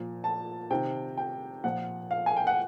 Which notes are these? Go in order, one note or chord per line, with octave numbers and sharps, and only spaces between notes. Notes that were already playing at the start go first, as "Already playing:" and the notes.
Already playing: A#2 F3
A5
C3 D#3 G5
G5
A#2 F3 F#5
F5
G#5
G5
F#5